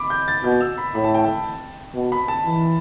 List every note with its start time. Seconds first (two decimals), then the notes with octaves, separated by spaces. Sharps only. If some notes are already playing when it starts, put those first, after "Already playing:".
Already playing: B5 D6
0.10 G6
0.28 A6
0.44 B2 G6
0.61 E6
0.78 B5
0.95 A2 B5
1.04 A5
1.15 G5
1.24 A5
1.95 B2
2.12 B5
2.28 A5
2.45 E3